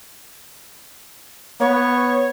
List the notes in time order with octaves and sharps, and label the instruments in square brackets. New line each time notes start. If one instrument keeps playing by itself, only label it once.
[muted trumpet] B3 [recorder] C#5